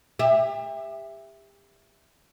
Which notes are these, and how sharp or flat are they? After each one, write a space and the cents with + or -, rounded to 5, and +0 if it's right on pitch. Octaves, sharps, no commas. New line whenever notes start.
G4 +35 E5 +0